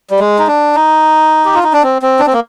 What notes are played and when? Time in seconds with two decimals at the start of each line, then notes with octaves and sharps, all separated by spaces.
0.10 G3
0.19 G#3
0.39 D#4
0.47 D4
0.75 D#4
1.45 G4
1.54 F4
1.63 D#4
1.73 D4
1.83 C4
2.02 C4
2.19 D4
2.26 C4
2.33 A#3